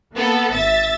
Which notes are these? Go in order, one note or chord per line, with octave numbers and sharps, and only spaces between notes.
A#3 B3 A4
G#1 E5 A6